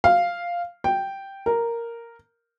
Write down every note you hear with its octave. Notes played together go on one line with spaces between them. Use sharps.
F5
G5
A#4